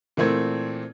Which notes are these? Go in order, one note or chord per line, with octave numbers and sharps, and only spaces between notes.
A#2 E3 A3 C4 G#6